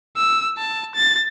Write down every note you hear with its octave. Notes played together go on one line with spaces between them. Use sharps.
E6
A5
A6